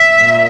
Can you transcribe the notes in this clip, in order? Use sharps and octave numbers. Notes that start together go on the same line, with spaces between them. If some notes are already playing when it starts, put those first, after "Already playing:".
Already playing: E5
A#2